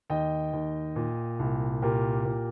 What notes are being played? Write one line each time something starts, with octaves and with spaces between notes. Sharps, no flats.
D#2 D#5 G5
D#2
A#2
C2
A#2 G4 A#4
A#2